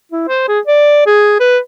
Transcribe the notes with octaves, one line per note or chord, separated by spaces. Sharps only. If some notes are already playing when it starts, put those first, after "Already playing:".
E4
C5
G#4
D5
G#4
B4